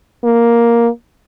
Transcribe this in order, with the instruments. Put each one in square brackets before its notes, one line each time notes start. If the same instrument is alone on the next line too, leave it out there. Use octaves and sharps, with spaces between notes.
[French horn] A#3